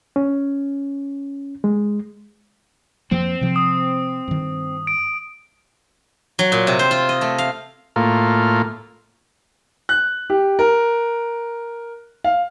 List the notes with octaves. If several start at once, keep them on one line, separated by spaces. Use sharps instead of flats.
C#4
G#3
F2 F3 A#3 C4
C3 F3
D#6
G2 D#3
D7
F#3
A#2
C3
C5
F4
D#5
A3
F5
A2 A#3 F4
F#6
G4
A#4
F5